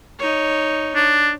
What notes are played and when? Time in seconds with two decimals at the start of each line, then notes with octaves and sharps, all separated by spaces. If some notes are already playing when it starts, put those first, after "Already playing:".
0.20 D#4 C#5
0.95 D4